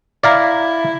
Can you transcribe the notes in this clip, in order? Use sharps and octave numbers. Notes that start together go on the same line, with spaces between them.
E4 D5 F5 A#5